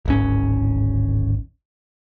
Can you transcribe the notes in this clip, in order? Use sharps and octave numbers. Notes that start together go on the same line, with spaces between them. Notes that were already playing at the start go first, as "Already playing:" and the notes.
D1 G#1 C#4